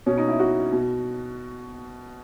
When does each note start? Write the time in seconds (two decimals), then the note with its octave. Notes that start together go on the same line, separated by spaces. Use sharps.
0.06 B2 C#4
0.18 D#4
0.28 E4
0.39 F#4
0.72 B2